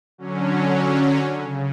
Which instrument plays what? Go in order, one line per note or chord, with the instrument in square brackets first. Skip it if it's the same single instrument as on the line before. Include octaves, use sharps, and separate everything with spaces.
[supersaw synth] D3 F#3 C#4
C#3